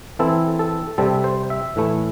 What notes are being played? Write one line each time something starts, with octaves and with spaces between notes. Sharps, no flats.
E3 C4 E4 A4
A4
C3 G3 C4 A4
C5
E5
A2 E3 A3 E4